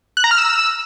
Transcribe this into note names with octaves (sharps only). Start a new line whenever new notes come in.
F#6
A#5
F6
E6